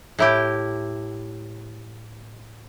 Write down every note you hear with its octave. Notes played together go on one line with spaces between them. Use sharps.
A2 E4 G4